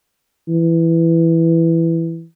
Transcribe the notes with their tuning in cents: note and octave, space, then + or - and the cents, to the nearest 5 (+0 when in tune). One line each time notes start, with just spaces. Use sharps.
E3 +5